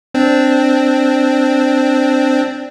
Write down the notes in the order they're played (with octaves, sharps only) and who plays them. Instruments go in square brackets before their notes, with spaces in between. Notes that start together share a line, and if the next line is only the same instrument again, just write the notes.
[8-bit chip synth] C4 D4